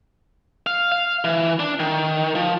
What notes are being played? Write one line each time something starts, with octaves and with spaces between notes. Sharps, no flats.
F5
F5
E3
D4
D#3
F3